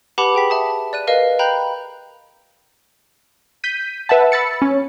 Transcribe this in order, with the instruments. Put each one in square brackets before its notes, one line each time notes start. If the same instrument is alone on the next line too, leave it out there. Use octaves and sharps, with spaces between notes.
[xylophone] G4 B4 F#5 A5 B5 D6
G#4 G5 B6
E5 A5 D#6
D5 F#6 D#7
A#4 B4 D#5 F5
G5 A#5 B5 F#6 G6
[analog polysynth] G6 B6 D#7
B4 E5 F#5 A5
B5 E6 A6 C#7
C#4